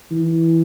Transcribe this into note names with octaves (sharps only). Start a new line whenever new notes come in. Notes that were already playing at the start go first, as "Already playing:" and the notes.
E3